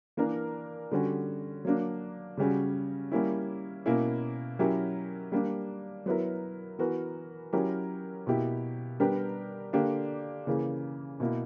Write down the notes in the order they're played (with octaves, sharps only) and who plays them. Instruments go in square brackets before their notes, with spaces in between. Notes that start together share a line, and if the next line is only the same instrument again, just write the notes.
[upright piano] E3 A#3 D4 A#4
D3 G3 C#4 F#4
F#3 A#3 D4
C#3 G3 C#4 F#4
G3 A#3 C#4 E4
B2 A#3 C#4 E4
F#3 C#4 E4 G4 A#4
G3 A#3 D4
F#3 B3 E4 A#4
E3 B3 F#4 A#4
F#3 C#4 E4 G4 A#4
B2 A#3 E4 G4
G3 B3 D4 G4 A#4
D3 A#3 D4 G4
C#3 E3 A#3
B2 A#3 E4